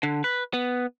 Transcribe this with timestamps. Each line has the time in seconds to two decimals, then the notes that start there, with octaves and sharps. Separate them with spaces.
0.03 D3
0.24 B4
0.54 B3